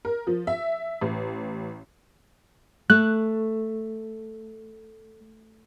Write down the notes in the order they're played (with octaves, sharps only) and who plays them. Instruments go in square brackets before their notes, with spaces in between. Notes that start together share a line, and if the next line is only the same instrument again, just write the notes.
[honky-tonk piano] A#4
F3
E5
A1
[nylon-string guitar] A3 [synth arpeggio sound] F#6